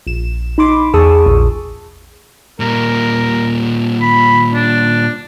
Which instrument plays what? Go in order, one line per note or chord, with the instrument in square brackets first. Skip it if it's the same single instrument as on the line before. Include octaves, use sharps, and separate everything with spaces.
[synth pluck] A#1 E7
D#4 B5 C6 D6
E2 G#4 A5 C#6 D#6 E6
A#1
[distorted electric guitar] A#2 G3 [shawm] A#4
[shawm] B5
D4